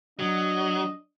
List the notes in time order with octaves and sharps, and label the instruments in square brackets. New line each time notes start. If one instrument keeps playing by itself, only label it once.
[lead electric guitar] F#3 [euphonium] D4 [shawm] D#5